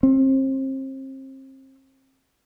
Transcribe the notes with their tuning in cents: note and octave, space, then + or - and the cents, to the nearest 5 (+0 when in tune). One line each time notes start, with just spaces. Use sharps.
C4 +35